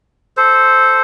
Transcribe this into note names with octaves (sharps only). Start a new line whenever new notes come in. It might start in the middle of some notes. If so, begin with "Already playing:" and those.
A4 C5